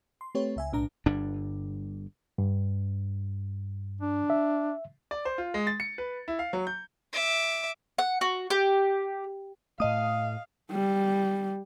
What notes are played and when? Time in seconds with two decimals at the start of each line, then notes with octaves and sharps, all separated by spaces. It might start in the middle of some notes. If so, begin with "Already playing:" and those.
0.21 C6
0.35 A3 C4 G4 B4 C#5
0.56 C#2 E5 G#5
0.72 B1 A2 D4 A#5
1.06 G1 G2 D4
2.38 G2
4.01 D4
4.30 E5
5.11 D5
5.25 C5
5.38 F4
5.54 G#3
5.67 A6
5.80 C#7
5.98 B4
6.28 E4
6.39 F5
6.53 F#3
6.67 G6
7.13 E5 D6
7.98 F#5
8.21 F#4
8.50 G4
9.80 A2 A3 D#5 F5 D#6
10.71 G3